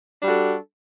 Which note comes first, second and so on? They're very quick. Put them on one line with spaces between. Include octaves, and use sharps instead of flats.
D4 G3 F#4 A4